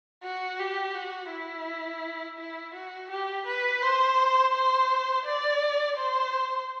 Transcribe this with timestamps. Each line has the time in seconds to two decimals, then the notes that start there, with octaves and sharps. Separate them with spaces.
0.23 F#4
0.59 G4
0.95 F#4
1.31 E4
2.38 E4
2.74 F#4
3.10 G4
3.46 B4
3.82 C5
4.53 C5
5.25 D5
5.97 C5